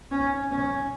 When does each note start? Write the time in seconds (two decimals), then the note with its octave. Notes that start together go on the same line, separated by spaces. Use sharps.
0.11 C#4
0.51 C#4